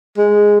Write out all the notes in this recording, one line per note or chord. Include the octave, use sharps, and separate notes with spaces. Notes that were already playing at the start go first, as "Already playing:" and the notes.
G#3